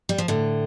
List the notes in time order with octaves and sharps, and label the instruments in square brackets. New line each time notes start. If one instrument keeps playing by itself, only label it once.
[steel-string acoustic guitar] G3
F3
A2 D3